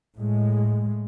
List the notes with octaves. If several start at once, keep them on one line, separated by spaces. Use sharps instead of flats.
A2 G#3